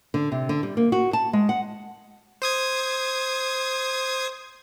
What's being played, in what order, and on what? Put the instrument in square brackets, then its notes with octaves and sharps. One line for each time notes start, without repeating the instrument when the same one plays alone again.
[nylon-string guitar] D3
C3
D3
G3
A#3
F#4
A5
G#3
F#5
[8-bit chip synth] C5 D#6 G#6